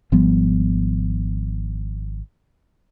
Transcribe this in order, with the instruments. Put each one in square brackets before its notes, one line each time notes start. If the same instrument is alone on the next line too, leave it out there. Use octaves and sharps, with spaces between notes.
[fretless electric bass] G#1 F3 G3 B3